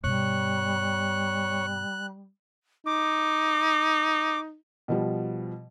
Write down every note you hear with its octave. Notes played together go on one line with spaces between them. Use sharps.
G2 B2 G3 C#5 F#6
D#4 D6
B2 F3 G3